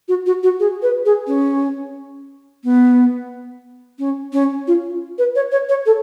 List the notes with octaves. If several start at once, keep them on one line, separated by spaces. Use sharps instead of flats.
F#4
F#4
F#4
G#4
B4
G#4
C#4
B3
C#4
C#4
F4
B4
C#5
C#5
C#5
A4